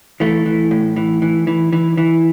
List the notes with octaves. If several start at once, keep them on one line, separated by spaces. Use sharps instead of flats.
E3 A3
E3
A2
E3
E3
E3
E3
E3